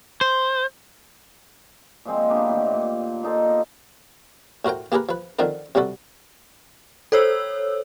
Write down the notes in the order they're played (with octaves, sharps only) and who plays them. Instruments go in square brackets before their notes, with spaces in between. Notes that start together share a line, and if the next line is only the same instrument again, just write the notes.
[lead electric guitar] C5
[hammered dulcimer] A#2 F3 G#3 C4
A#3 B3 D4 G4
A2 D#3 E3 C4
A#2
A#2 D#4 A4 C5
B3
[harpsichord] A2 F#4 A#4 C5 G5
A#3 G4 G#4 A#4 B4
F3 B4
D3 D#3 F3 C4 F4 A#4
C3 F#3 G3 F#4 A4
[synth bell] A4 C5 C#5 E6